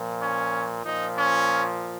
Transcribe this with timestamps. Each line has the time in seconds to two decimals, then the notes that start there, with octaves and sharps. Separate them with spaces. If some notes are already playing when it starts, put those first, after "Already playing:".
Already playing: A#2 F3
0.21 C#4
0.84 A#2 F3 D#4
1.18 C#4